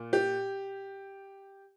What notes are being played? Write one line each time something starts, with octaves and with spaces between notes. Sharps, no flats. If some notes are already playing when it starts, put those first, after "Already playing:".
Already playing: A#2
G4